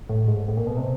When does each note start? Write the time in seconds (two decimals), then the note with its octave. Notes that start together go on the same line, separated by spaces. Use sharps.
0.09 A2
0.28 G#2
0.48 A2
0.57 A#2
0.67 B2
0.77 C3